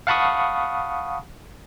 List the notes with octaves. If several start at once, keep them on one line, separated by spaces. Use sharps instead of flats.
F5 F#5 A5 B5 C#6 D#6